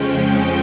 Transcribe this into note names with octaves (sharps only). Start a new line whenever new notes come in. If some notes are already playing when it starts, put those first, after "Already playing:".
Already playing: F2 C#3 F3 G#3 C#4 G5